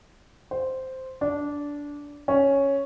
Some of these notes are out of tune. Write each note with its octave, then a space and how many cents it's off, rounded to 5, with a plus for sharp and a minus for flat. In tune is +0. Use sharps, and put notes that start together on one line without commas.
C5 -5
D4 -15
C#4 +0